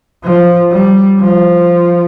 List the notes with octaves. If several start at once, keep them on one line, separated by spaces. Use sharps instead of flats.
F3
G3
F3